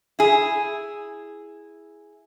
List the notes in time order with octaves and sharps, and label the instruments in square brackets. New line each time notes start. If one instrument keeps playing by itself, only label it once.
[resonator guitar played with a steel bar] E4 G#4